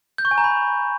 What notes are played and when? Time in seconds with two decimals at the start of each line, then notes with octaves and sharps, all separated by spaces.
0.18 G6
0.25 C#6
0.31 G#5
0.38 A#5
0.44 B5